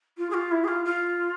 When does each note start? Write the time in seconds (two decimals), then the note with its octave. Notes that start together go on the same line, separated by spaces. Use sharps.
0.17 F4
0.30 G#4
0.34 F4
0.51 E4
0.64 G#4
0.68 F4
0.85 F4